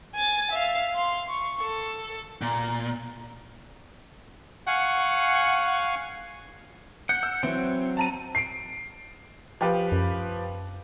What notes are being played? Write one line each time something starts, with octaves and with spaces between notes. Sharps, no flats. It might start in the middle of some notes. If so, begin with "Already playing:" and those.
G#5 A6
E5 F5
F5 C6
C#6
A4
A#2
F5 F#5 G#5 C#6
F#5 G6 C#7
E6
E3 F#3 C4
A5 A#5 D#7
C7 D7
F3 G4 B4
F#2